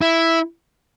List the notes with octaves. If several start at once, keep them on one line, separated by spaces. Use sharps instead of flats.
E4